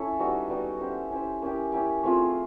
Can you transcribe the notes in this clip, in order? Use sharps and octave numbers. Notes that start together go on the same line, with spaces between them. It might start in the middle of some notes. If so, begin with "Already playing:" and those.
Already playing: C#4 E4 A4
G3 B3 D#4 F#4
G3 B3 D#4 F#4
C#4 E4 G4 C5
C#4 E4 G4 C5
A#3 C#4 E4 G4
A#3 C#4 E4 G4
A3 C4 F4 G#4